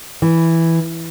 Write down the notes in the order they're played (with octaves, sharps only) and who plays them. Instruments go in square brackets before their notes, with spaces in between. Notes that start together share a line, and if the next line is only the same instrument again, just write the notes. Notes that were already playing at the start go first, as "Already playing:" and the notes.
[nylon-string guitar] E3